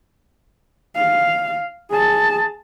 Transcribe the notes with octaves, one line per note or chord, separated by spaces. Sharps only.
F5
G#4 A5